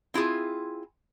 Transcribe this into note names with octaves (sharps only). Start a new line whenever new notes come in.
C4 E4 F4 G#4